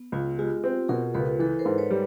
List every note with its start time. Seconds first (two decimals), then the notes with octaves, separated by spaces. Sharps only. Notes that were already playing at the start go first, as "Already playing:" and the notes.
Already playing: B3
0.12 C#2 F4
0.38 G#3 F4 G4
0.64 C4
0.88 B2 G#4 A#4
1.14 C#2 A4 B4
1.39 E3 A4 B4
1.59 A#4 C5
1.65 G#2
1.78 B4 C#5
1.91 G3